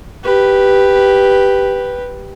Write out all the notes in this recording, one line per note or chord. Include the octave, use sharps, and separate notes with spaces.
G4 B4